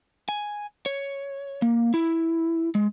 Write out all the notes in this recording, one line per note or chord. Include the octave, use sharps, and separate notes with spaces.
G#5
C#5
A#3
E4
G#3